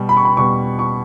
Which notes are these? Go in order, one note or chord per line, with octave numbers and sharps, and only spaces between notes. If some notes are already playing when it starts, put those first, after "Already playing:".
Already playing: B2 G3
B5
C#6
B5
B2 G3 C#6
C#6